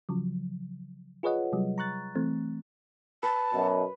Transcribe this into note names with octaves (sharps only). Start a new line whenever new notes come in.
C#3 F3 F#3
F4 G#4 B4 C#5 D#5 F#5
C3 F#3 G3
A#5 C#6 F#6 A6
E3 A3 C4
B4 A5
F#2 B2